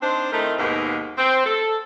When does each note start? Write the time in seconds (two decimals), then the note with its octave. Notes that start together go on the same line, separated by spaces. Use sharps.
0.02 C4 D4 D#4 C5
0.32 D#3 A3 C4 D#4 E4 A#4
0.59 D#2 G#2 B2 A#3 B3
1.18 C4
1.46 A4